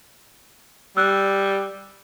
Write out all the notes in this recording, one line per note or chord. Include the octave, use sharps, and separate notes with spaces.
G3 E6 F#6